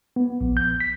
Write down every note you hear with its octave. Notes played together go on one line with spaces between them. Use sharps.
B3
A#1
G6
B6